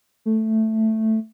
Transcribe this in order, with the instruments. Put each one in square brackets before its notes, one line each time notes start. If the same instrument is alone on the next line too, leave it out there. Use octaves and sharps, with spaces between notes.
[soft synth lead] A3